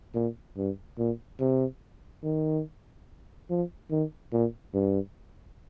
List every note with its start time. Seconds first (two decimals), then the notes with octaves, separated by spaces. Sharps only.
0.14 A#2
0.57 G2
0.98 A#2
1.40 C3
2.24 D#3
3.50 F3
3.91 D#3
4.33 A#2
4.74 G2